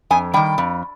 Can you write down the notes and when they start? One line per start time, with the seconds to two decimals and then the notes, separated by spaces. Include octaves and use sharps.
0.10 F2 G#5
0.34 D#3 G3 G5
0.58 F2